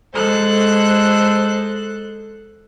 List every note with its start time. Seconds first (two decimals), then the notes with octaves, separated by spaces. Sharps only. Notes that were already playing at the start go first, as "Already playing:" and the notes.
0.14 G#3 A4 C5 F#6